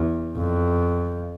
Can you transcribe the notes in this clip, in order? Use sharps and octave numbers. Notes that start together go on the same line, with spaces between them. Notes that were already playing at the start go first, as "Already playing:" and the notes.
Already playing: E2
F2